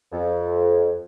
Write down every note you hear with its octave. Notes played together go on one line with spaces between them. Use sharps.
F2